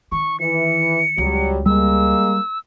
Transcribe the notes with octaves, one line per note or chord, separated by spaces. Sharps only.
D#3 C#6
E3 C#7
C#2 F#3 G3
G3 G#3 A#3 E6